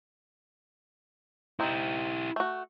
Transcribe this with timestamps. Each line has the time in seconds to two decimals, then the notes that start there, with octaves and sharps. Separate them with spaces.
1.60 C4 D#4 E4 G4
2.36 A3 F#4